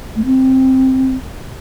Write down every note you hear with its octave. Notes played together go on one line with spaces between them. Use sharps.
A3
C4